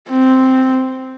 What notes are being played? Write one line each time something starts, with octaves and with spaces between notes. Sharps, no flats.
C4